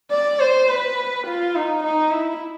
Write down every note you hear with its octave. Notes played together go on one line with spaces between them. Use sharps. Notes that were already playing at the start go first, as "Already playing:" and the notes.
D5
C5
B4
F4
D#4
D#4
E4